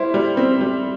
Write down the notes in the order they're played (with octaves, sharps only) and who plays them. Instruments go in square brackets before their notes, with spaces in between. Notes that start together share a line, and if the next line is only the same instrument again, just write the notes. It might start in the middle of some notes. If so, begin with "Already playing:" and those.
Already playing: [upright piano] G3 E4 [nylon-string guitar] C5
[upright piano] G3
C4
G3